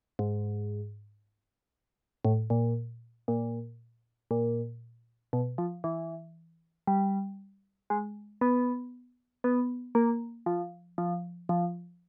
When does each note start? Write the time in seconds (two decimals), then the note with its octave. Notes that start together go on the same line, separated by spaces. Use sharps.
0.19 G#2
2.25 A2
2.50 A#2
3.28 A#2
4.31 A#2
5.33 B2
5.58 F3
5.84 E3
6.87 G3
7.90 G#3
8.41 B3
9.44 B3
9.95 A#3
10.46 F3
10.98 F3
11.49 F3